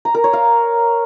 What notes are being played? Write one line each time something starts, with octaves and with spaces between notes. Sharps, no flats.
A#5
A#4
C#5
F5